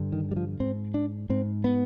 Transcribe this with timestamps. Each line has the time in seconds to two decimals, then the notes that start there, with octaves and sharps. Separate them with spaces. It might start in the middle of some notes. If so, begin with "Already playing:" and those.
Already playing: G2 D3
0.12 D#3
0.31 G3
0.36 F3
0.60 G#2 C4
0.94 D4
1.30 G#2 C4
1.64 B3